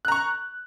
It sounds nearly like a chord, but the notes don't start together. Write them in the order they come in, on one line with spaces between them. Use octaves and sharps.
F#6 A#5 C#6